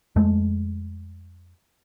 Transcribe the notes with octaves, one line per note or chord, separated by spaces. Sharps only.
F2 G#3 A3